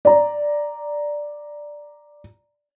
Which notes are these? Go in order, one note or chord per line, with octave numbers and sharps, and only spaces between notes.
D5 A#5